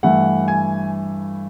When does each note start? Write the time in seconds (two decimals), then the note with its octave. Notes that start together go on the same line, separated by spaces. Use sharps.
0.03 G2 E3 A3 F#5
0.48 G#5